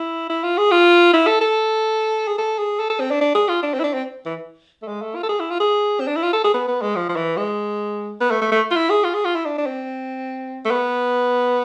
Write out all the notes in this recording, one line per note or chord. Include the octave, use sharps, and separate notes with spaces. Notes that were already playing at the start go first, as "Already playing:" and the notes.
Already playing: E4
E4
F4
G#4
F4
E4
A4
A4
G#4
A4
G#4
A4
A4
C4
D4
D4
G#4
F4
D4
C4
E4
D4
C4
E3
A3
G#3
A3
F4
A4
G#4
E4
F4
G#4
C4
D4
E4
F4
A4
G#4
B3
B3
G#3
F3
F3
E3
G#3
B3
A3
A3
A3
F4
E4
G#4
F4
G#4
F4
E4
D4
D4
C4
A3
B3